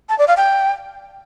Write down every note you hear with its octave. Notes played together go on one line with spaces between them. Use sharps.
A5
D5
F5
G5